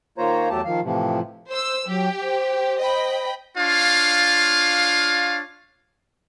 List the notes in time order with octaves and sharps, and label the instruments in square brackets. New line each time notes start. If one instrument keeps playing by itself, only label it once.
[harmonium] D#3 A#3 F4 C5 C#5 A#5
E2 F#3 A3 G4 A5
D#3 F3 F5
A2 C3 E3 F3
[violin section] C5 E6
[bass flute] F#3 [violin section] G4
[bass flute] C5
[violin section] D#5 G5 B5
[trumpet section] D4 F4 C#5 F5